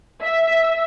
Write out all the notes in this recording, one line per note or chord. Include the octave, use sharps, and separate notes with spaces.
E5